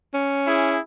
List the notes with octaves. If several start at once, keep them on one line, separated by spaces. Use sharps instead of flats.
C#4
E4 G#4